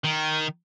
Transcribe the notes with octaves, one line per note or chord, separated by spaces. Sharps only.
D#3